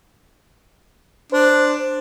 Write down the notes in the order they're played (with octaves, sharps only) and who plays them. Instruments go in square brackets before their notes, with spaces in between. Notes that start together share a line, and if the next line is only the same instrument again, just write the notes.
[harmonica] D4 [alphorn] C5